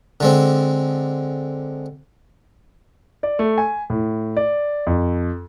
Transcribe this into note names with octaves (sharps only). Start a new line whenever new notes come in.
D3 G#3 C4
D5
A3
G#5
A2
D5
F2